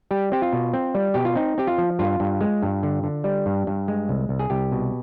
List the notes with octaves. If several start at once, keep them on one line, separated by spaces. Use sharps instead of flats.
G3 G4
C4 G4
F4
B2
C4
G3
B2 G4
F4
C4 D#4
C4 G4
F4
F3
G2 F4
G2
G#3
G2
D3
D3
G3
G2
G2
G#3
C2
C2
G#4
C2 G4
B2